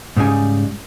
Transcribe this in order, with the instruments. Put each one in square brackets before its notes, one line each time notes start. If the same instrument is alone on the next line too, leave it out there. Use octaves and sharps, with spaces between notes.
[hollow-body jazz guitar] G#2 C#3 G3 D#4 G#5